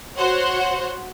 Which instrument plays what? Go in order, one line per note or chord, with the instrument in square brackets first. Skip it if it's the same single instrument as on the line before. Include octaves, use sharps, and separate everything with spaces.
[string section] F#4 C5 C#5 F#5